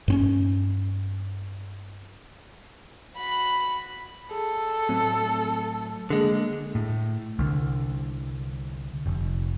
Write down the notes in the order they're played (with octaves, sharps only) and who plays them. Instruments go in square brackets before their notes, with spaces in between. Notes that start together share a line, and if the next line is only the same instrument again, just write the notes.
[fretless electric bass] G2 C4 C#4
[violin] F#4 B5
[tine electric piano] G#4 [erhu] A4
[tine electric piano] A2 F#3 A3 [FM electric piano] C4
[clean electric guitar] D3 G#3 [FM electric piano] A#3 G#4
[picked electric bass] A2
C2 D3
F1